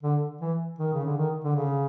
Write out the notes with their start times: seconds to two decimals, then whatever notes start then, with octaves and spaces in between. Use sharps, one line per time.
0.03 D3
0.41 E3
0.79 D#3
0.94 C#3
1.05 D3
1.17 D#3
1.44 D3
1.56 C#3